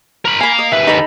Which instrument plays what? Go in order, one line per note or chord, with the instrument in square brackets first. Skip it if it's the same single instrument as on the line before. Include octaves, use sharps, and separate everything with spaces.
[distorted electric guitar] A#4 B5
[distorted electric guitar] F5 A#5 [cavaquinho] G#5 B5
[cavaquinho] D#5
[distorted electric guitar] D#2 B4 [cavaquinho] E5
[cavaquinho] D#4 A4 B5